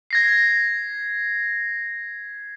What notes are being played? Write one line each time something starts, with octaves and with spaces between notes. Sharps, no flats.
G#6 A#6 C7